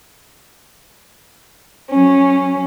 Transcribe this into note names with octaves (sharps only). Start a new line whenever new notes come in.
F#3 C#4